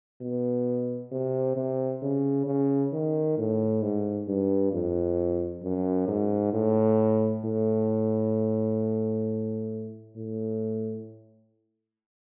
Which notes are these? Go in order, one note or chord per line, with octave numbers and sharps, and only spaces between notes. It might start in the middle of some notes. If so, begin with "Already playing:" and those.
B2
C3
C3
C#3
C#3
D#3
A2
G#2
G2
F2
F#2
G#2
A2
A2
A2